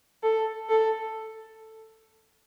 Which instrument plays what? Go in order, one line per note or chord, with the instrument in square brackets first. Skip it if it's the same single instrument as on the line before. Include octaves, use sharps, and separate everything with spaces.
[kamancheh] A4
A4